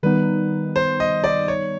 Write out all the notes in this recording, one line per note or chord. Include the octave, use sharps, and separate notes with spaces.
D#3 G3 B3 D#4 B4
C5
D#5
D5
C#5